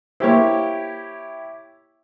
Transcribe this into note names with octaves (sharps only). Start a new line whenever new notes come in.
A#3 E4 G4 C5 C#5